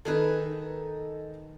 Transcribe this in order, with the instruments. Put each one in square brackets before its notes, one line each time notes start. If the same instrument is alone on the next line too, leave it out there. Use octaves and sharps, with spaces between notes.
[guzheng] D#3 G#4 B4 [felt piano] D#4 A4